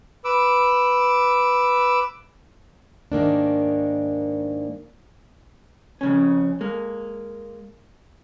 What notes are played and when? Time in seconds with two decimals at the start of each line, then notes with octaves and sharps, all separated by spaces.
0.25 B4 D6 E6
3.12 G#2 D#3 A#3 D4
6.01 F2 C#3 C#4
6.61 G#3 A#3